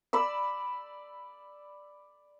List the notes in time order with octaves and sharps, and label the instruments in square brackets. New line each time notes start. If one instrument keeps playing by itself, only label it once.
[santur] D5 B5 E6